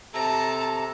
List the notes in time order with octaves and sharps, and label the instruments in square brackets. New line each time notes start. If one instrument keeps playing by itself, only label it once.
[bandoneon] C3 A4 [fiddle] A5 A#5